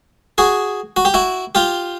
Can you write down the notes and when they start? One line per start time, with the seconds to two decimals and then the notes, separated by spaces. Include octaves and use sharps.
0.38 F#4 G#4
0.97 F#4
1.05 G4
1.14 E4 F#4
1.55 F4 G4